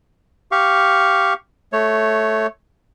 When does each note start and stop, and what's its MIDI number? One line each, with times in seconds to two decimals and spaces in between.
0.52 1.34 67
0.52 1.34 77
0.52 1.34 85
1.73 2.47 57
1.73 2.47 73